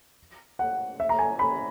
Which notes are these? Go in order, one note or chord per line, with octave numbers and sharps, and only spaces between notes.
F#5
E5
A#5
G#5
B5